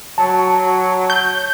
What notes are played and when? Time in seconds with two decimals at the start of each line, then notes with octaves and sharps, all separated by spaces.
0.18 F#3 A5
1.10 G6